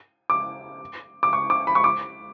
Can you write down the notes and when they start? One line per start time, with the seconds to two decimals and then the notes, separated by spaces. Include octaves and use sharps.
0.30 D6
1.23 D6
1.33 C#6
1.50 D6
1.67 B5
1.75 C#6
1.84 D6